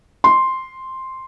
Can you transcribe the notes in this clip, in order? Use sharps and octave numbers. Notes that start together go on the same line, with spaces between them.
C6